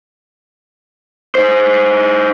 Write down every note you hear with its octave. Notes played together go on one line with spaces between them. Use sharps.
D#4 C5